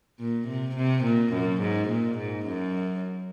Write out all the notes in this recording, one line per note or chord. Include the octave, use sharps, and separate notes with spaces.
A#2
C3
C3
A#2
F#2
G#2
A#2
G#2
F#2